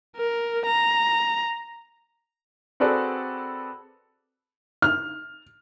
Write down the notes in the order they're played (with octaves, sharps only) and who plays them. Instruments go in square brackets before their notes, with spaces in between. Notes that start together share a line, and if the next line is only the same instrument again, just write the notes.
[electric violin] A#4
A#5
[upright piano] C4 F#4 G#4 A4 B4 D5
F6